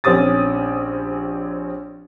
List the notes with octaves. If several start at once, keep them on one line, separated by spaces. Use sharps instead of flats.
A#1 C4 C#4 G4 D#6 A6